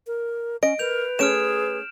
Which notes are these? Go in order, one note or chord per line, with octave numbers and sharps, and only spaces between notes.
A#4
C#4 D#5 D7
A#4 B4 G6 F7
A3 C#4 G#4 F6 D7 E7